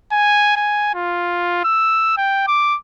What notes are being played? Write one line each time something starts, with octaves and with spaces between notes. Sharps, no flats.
G#5
G#5
F4
E6
G5
D6